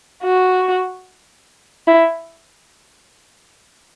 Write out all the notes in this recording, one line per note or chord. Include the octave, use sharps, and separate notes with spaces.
F#4
E4